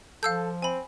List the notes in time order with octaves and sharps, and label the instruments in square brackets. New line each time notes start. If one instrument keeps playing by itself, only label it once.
[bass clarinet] F3 [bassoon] A4 [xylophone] F5 E6 G6
[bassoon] C4 [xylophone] G#5 B5